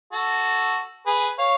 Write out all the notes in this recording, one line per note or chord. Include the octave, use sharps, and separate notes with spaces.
F#4 A4
G#4 B4
C#5 F5